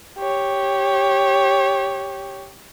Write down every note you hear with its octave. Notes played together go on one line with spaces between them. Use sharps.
G4 C#5